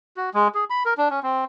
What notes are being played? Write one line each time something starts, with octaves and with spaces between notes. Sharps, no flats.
F#4
G#3
G#4
B5
A#4
D4
C#4
C4